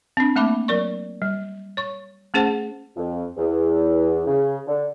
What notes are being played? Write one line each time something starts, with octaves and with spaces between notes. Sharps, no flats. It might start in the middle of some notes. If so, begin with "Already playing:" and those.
C4 D4
A3 A#3 E5 A5 B5 D6
F#3 A#4 D5 C#6
G3
C#5 C#6
A3 C#4 G#4 C5 F#5 A5
F2
E2
C#3
D3